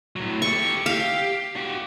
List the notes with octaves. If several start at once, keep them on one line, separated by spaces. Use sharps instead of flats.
A2 F#3
G4 A4 C#6
G4 F5
F#4 G4